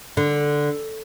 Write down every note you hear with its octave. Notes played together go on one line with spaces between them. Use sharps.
D3